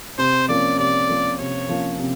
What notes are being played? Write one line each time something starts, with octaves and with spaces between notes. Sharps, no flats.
C3 C5
F3 A#3 C#4 D5
C3 D5
F3 A#3 C#4
C3 C#5
F3 A#3 C#4
C3